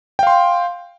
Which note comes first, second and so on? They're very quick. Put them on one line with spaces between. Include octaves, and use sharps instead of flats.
G5 F5 C6